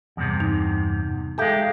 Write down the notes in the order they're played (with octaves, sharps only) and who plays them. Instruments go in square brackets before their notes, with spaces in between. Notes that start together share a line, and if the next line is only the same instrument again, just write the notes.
[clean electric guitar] E2 G2 C3
[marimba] D#4
[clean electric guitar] G#3 G4 [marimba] A4 E5 F5